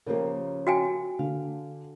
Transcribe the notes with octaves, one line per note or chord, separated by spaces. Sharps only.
C#3 F3 A#3 G4 A#4
F#4 G5 G#5
D3 F5